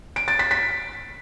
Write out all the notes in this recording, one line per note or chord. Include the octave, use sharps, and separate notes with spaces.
D7
A6
B6
B6